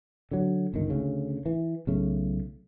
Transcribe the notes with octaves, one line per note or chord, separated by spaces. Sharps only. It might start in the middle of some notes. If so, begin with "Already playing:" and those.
D3 F#3
G1 C#2 D#3
D2 C#3
E3
B1 C#3 A3